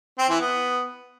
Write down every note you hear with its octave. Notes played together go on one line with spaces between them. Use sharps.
C4
E3
B3